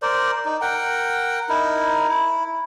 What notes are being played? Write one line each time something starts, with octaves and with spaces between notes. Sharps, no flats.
A#4 C5 D5
D#4
A#4 F#5 G5
D#4 E4 A#4
E4